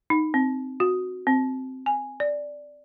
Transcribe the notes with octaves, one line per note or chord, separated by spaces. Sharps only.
D#4
C4
F#4
C4
G#5
D5